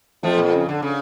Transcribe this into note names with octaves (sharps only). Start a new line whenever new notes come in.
F2 F3 A3
A#2
C#3
D3
C#3